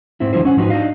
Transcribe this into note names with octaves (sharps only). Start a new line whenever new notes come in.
G#2 C4 E4
E2 G#2 D3 F3 E4 C5
C#4 F#5
G#2 F3 D#4 F#4 B4
D4 D#4 D#5 F5